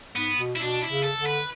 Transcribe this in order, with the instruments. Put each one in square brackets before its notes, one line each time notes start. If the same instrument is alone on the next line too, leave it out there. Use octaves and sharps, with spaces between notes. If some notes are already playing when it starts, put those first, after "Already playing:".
[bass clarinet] G#2 [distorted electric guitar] B3
[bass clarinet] B2
[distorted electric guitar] E4
[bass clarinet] B2 [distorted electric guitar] D4
[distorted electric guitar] E4
[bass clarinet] C#3
[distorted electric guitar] A4
[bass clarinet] D3
[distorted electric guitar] B4